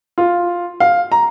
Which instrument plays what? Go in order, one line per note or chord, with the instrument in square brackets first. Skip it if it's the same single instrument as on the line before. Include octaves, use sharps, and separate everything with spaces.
[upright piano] F4
F5
A#5